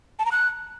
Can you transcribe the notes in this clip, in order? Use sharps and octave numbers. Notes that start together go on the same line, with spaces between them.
A5
A#5
F#6